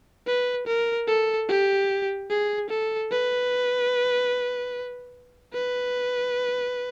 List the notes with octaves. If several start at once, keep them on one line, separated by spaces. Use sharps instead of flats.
B4
A#4
A4
G4
G#4
A4
B4
B4